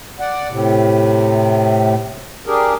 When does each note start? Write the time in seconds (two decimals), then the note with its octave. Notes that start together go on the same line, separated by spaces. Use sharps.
0.20 D5 F#5
0.49 A2 C3
2.47 D4 G4 G#4 A#4